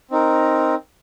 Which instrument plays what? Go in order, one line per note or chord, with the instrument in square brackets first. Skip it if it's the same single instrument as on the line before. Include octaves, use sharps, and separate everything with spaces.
[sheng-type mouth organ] C4 D#4 A#4